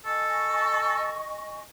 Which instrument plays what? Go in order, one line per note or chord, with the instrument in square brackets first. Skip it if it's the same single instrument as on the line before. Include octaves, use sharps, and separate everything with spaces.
[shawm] A4 [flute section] D#5 G#5 C#6